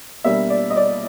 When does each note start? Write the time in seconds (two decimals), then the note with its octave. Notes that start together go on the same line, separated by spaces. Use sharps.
0.24 B2 G3 A#3 D4 E5
0.50 D5
0.70 D#5
0.77 D5